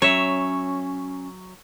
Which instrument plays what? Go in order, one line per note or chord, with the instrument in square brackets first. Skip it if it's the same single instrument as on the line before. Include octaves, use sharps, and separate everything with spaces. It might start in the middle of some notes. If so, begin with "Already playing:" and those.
[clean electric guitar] F#3 E5 [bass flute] C#4 [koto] C#5